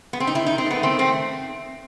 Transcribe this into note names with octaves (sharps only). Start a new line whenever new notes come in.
B3
C4
D#4
D#3 E4
D#4
D#3
C4
A3 B3
D#3 C4
A3 C4